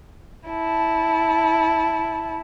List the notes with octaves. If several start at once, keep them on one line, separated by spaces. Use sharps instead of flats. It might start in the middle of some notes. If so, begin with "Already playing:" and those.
E4 A5